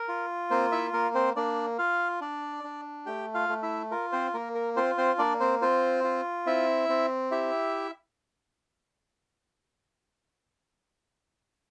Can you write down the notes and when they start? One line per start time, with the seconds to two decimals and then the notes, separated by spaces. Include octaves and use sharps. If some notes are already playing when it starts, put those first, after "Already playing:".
Already playing: A#4
0.09 F4
0.51 A#3 C4 C5
0.72 E4 E5
0.93 A#3 A#4
1.15 C4 C5
1.36 A#3 D4 D5
1.78 F4 F5
2.21 D4 D5
2.64 D4
3.06 A3 G4 G5
3.34 F4 F5
3.49 A3
3.63 E4 E5
3.91 F4 A#4
4.12 C4 C5
4.34 A#3 A#4
4.55 A#4
4.76 C4 F4 C5
4.98 C4 C5
5.19 A#3 D4 D5
5.40 C4 C5
5.61 C4 F4 C5
6.04 F4
6.46 C4 E4 E5
6.89 C4
7.31 E4 G4 E5